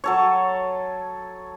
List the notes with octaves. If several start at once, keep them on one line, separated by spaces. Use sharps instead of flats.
F#3 A4 C#5